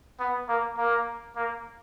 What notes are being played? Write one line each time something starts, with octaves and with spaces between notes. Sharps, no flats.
B3
A#3
A#3
A#3